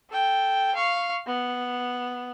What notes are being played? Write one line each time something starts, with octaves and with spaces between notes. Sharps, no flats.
A4 G5
F5 C#6
B3